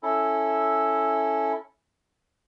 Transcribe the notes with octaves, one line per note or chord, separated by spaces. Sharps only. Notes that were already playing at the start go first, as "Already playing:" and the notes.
C#4 E4 A4